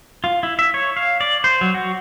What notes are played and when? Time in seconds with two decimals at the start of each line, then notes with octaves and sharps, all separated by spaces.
0.24 F4
0.43 E4
0.59 E5
0.74 C#5
0.97 F5
1.21 D5
1.44 C5
1.61 F#3
1.74 F#4